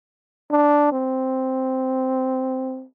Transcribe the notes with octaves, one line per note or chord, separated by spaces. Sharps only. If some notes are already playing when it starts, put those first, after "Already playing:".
D4
C4